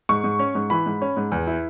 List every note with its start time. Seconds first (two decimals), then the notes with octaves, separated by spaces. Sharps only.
0.09 G#2 C#6
0.24 G#2
0.39 C#4
0.55 G#2
0.70 E3 B5
0.86 G#2
1.02 C#4
1.17 G#2
1.32 E2
1.47 E4